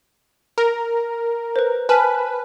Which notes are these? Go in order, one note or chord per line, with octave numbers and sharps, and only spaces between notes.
A#4
B4 C5
B4 G#5 A5 F6